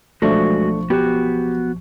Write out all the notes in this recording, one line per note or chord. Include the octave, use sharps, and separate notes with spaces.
B1 F3 G#3 A3 D4 F#4 C#6
B3 F#4 G4